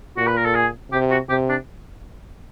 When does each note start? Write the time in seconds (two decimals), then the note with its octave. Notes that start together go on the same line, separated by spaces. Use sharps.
0.17 A#2 F#4
0.27 B4
0.37 A#4
0.46 A4
0.55 G#4
0.92 C3 G4
1.11 F#4
1.30 C3 G4
1.49 D4